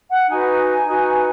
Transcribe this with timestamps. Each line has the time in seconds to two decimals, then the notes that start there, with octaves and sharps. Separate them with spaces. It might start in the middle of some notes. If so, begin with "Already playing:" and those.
0.10 F#5
0.29 D#4 F#4 B4 G#5
0.85 D#4 F#4 B4